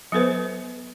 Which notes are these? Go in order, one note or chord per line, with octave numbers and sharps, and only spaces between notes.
F#3 B3 A4 B4 C5